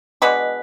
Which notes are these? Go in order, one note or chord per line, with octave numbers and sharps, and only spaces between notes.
B2 G#3 B3 D4 B4